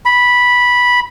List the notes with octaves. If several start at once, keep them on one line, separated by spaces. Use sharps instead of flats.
B5